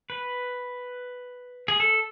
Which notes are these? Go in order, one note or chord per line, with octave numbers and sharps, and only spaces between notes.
B4
G#4
A4